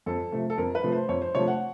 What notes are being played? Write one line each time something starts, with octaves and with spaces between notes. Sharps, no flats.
F2 A4
C3 F3 A3
A4
F2 A#4
B4
C3 F3 A3
C5
F2 C#5
C5
C3 F3 A3 C#5
F#5